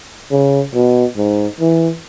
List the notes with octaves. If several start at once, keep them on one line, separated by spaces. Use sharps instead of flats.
C#3
B2
G#2
E3